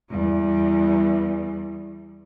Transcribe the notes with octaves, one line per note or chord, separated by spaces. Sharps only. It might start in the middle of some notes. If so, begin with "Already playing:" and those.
E2 G3